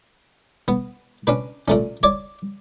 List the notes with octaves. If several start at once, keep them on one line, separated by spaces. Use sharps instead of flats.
B3
C#4 D4 B4
A#2 A3 C#4
C#5 D5 D6